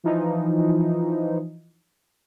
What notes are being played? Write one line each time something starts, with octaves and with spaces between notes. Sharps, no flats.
E3 F3 D#4